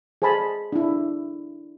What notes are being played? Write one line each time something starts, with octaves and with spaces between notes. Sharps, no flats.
G#4 C5 G#5 A5 B5
D4 E4